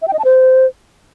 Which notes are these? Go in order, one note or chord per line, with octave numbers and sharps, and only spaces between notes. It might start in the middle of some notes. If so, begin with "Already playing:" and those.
E5
G5
D#5
A5
C5